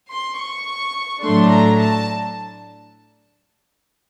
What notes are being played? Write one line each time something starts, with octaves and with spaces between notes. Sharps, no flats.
C6
C#6
A2 F#3 A3 D4 C6
A#5
A5